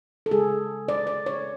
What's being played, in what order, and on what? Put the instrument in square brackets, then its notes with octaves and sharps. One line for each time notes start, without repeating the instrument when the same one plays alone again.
[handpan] A4
C#3 G#3 G#4
D5
D5
C#5